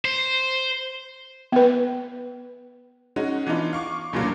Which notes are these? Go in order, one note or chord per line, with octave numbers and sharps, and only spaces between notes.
C5
B3 B4
G#3 C#4 D#4 F#4
E3 B3 D4 D#4 F4
F5 C#6 D6
C#2 G2 A#2 D3 F#3 A#3